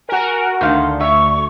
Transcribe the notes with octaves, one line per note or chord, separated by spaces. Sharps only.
F#4 A#4 G#5
D2 D#3 F5 F#5 C6
E5 C#6